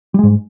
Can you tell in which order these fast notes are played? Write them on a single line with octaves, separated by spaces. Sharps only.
G3 G#3 G#2